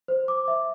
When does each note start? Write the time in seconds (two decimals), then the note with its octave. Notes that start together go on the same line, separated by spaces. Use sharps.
0.08 C5
0.28 D6
0.48 E5